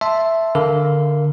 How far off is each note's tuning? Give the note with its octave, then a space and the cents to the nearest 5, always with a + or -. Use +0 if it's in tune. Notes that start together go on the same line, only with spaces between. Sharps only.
E5 +0 A5 +0 C6 +0
D3 +0 A#4 +0 F5 +0